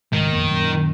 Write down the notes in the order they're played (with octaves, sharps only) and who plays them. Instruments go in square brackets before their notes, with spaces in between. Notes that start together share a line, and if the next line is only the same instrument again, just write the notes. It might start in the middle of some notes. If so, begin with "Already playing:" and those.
[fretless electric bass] G#1 C#2 G#2 [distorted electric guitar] D#3
[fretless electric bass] A#1 F2 A#3
F#2 A#2